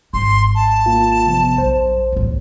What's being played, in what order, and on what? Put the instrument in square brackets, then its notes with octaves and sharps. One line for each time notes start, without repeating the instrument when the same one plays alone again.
[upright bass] G#1 [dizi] C6
[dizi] A5
[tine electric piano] A#3 F4
C3 F3 B3
[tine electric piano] A#1 C5 [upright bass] F#2 D4
[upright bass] A1 D2